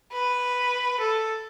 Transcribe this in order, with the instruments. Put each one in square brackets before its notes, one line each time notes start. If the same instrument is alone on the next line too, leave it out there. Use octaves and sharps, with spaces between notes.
[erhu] B4
A4